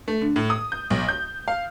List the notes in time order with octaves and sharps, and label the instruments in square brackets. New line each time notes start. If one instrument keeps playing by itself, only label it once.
[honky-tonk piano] A3
D3
A2
D#6
G6
B1
G6
F5